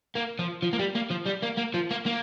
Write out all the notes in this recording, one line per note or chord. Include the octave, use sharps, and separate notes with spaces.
A#3
F3
F3
A#3
G3
A#3
F3
G3
A#3
A#3
F3
A#3
A#3